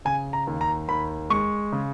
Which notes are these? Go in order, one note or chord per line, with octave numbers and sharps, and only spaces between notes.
C#3 G#5
A#5
D#2
A#5
D#2 B5
G#3 C#6
C#3